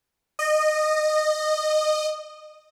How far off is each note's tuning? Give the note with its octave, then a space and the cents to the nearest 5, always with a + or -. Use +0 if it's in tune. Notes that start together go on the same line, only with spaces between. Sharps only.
D#5 -20